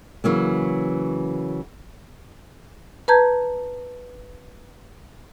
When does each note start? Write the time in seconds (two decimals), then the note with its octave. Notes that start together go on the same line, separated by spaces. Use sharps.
0.24 C#3 E3 F#3 A#3
3.08 B4 A5 A#5 G6 G#6